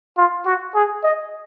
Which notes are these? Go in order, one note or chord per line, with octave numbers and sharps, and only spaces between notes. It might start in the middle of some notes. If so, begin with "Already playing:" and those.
F4
F#4
G#4
D#5